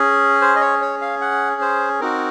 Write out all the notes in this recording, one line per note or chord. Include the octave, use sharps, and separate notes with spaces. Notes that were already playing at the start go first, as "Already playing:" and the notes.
Already playing: C#4 G#4
C5
D#5
C#5
C#5
F5
F#5
C5
C4 D#4 F#4 A#4